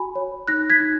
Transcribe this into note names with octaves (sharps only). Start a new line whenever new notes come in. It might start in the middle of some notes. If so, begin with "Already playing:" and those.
Already playing: F#4 G#5 B5
C#5
D#4 F#6 A#6
G#6 B6
D#4